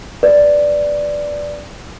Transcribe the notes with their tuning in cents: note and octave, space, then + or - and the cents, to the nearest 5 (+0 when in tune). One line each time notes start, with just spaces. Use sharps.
B4 +10 D5 +0